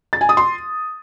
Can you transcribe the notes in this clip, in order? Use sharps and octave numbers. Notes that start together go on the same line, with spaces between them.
A6
G#5
D#6
C6